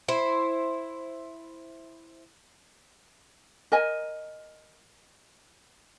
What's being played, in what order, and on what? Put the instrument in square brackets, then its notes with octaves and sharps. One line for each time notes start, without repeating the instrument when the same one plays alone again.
[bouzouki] E4 C5
[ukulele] A#4 D#5 G#5